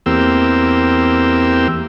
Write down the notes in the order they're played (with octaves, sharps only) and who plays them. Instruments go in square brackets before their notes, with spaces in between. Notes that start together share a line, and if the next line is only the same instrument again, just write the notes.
[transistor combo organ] E2 A#3 C4 G4 E6